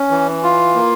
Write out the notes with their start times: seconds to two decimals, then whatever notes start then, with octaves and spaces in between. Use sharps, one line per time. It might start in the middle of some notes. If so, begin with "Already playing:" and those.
Already playing: C#4
0.10 E3
0.43 F4
0.75 A#3